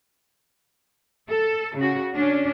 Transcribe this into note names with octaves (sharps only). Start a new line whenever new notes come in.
A4
C#3 F#4
C#4 D4